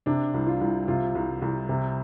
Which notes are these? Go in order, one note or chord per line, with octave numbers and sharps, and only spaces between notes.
C3 D4
C2
F4
C2
C3 F4
C2
C2
C3